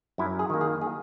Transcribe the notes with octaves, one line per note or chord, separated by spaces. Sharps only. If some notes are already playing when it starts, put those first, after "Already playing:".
F#2 E4
G#4
D#3 A#3
G#4
G#4